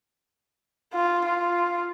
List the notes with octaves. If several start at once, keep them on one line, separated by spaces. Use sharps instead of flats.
F4
F4